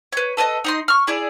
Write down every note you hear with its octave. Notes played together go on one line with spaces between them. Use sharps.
B4 C#5
A4 B4 D5 D#5
D#4 D#5 C6
C#6 F6
E4 G#4 D5